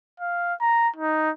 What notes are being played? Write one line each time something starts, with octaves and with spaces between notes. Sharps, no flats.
F5
A#5
D#4